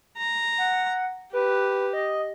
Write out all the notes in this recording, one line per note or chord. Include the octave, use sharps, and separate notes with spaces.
A#5
F#5
G4 B4
D#5